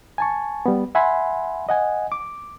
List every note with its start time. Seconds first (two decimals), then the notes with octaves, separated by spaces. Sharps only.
0.18 G#5 A5 C#6
0.66 G3 B3
0.95 E5 F#5 G#5 B5 C6
1.69 D#5 F#5 G#5
2.12 D6